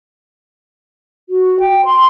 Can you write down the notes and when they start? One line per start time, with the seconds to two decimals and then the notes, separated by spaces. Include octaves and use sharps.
1.29 F#4
1.60 G5
1.85 C6